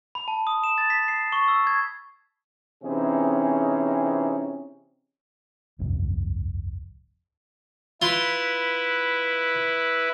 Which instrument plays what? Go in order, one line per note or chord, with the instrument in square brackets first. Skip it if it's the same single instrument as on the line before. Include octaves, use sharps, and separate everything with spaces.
[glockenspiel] B5
A5
D#6
E7
A6
B6
C7
C#6
E6
G#6
[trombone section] C3 E3 C4 C#4 D#4 G#4
[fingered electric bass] D1 G1 C2 F2
[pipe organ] E4 B4 [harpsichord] F4 C6